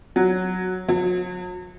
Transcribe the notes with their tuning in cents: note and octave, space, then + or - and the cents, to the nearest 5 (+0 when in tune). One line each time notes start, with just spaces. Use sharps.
F#3 -5
F#3 -40